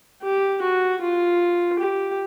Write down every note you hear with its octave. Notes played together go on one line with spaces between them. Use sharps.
G4
F#4
F4
G4